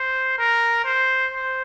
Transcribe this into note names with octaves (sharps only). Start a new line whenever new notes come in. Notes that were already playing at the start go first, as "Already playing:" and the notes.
Already playing: C5
A#4
C5
C5